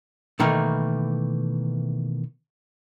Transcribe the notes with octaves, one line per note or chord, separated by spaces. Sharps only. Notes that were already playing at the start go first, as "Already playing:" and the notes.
B2 D#3 E3 A3 A#3